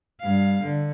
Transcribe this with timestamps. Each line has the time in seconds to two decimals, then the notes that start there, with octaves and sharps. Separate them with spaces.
0.20 G2 F5
0.63 D3